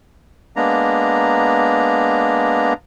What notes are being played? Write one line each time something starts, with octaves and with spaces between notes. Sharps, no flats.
G#3 A#3 B3 D4 A#5